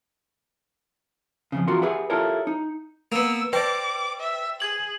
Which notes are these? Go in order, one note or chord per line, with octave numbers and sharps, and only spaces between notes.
F2 G#2 C#3
E2 F4 F#4 A#4 C6
G4 G#4 B4 E5 F#5
E4 F4 G4 A4 A#4 C#5
D#4
A#3 B3 E6
B4 C5 D5 G5 D6
E5
G#4 G#6 F#7